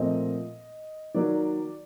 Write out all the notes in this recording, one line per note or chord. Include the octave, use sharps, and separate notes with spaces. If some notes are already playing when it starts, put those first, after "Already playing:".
Already playing: A#2 F3 A3 C4 D#5
D#3 F#3 A#3 D5